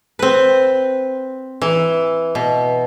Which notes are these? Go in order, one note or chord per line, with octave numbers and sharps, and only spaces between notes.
C4 B4
E3
B2